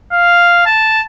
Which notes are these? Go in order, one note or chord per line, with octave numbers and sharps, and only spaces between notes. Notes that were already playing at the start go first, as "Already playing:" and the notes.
F5
A5